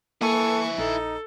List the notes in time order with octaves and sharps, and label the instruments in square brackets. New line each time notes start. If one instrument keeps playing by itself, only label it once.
[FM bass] A#3 [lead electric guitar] E4 G#5 [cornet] A4 [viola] C#6
[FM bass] A#1 [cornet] D#4 [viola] A4